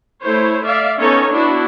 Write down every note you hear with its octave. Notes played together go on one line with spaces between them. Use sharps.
A3 E4 C5 C#5
D5 E5 F5
B3 C#4 D#4 A4 C#5
B3 D4 E4 F#4